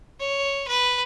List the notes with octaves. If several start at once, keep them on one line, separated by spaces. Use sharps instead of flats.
C#5
B4